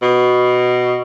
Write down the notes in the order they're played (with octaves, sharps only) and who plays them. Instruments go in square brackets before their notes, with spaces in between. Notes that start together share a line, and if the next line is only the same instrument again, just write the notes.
[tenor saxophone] B2